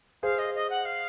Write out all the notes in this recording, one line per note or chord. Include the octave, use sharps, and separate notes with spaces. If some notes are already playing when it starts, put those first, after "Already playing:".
G#4 C5 F5
D#5
D#5
F#5
F5